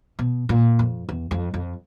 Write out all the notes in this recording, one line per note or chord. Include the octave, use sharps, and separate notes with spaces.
B2
A#2
F2
E2
F2
F2